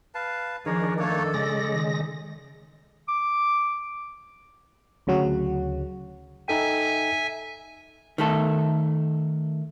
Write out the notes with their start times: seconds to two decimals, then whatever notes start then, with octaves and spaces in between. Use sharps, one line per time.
0.15 B4 F5 A5
0.66 D#3 F3 D4 G#4 A#4 C#5
0.99 A3 A#3 A4 C#5
1.34 C#3 G#3 D5 A#6
1.71 D#3
3.08 D6
5.07 D2 C#3 F#3 F#4
6.48 D#4 A4 E5 G5 G#5
8.18 D#3 A3 A4